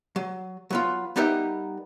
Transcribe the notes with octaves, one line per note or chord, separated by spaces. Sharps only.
F#3
F#3 B3 F4
G3 B3 D#4 G4 A#4 E5